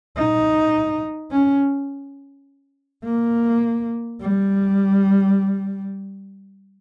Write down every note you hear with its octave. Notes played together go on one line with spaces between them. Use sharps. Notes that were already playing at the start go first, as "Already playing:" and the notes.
D#4
C#4
A#3
G3